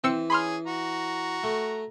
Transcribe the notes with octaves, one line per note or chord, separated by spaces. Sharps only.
E3 C4 E6 C#7
C#4 G#4 B5 C6 F6
F#4 A#5
A3